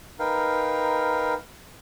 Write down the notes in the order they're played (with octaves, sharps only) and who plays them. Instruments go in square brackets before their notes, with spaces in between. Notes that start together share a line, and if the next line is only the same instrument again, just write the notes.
[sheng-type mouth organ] D#4 A#4 B4 F5 G5